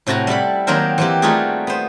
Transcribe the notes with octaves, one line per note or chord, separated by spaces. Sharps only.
A2 C3 F#4 A5 A#5
G3 E4 A4 B5
D#3 F#3 A#3 C4 A#4 C5
E3 C4 G4
G3 A3 D#4 F4 F#4 G#4
B3 C5